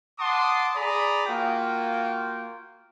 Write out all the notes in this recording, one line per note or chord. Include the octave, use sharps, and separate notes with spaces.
F#5 A5 C6 D6 D#6
G#4 D5 A#5 B5 D#6
A#3 F4 F#4 G5